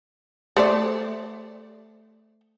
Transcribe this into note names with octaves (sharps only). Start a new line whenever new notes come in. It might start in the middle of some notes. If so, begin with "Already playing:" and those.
A3 C5 D5